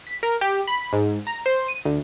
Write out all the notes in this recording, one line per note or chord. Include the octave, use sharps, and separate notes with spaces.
B6
A#4
G4
B5
G#2
A#5
C5
D#7
D2